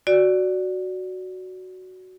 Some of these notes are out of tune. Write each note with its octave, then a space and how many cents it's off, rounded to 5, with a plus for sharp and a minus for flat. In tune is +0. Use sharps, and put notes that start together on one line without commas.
F#4 +0 D5 +0